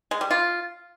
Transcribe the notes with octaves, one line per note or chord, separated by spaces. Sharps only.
G#3
G3
F4